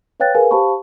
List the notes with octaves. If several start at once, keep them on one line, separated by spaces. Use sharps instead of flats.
B4 C#5 F5 G5 F#6 A6
G#4 A#4 B4 F5 G#5
G4 C5 F5 A5 B5 C#6